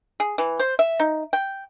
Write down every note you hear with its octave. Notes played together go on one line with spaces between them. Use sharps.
G#4
E3
C5
E5
D#4
G5